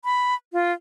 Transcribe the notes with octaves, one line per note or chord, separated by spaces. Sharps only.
B5
F4